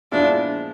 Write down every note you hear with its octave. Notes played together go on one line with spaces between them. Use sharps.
A#2 F3 G#3 B3 D4 E4